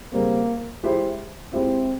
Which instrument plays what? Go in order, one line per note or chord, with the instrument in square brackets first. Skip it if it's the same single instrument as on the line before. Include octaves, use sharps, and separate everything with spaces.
[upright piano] C#3 G3 C4 [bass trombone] A#3
[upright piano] G#3 E4 G4 C5 E5
[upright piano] G#3 E4 G4 C5 E5 [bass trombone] C4